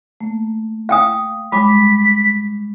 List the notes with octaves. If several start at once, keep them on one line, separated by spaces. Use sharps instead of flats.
A3 A#3
F5 G5 D#6
G3 G#3 B5 D6 B6